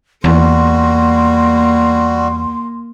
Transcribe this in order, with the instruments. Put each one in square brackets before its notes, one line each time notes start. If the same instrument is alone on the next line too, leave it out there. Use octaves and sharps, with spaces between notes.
[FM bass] E2 [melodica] G3 F#4 [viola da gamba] A#3 [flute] C6